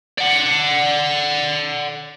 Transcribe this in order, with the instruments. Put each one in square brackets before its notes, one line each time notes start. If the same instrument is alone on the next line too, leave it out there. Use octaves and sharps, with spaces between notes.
[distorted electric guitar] D5 F#5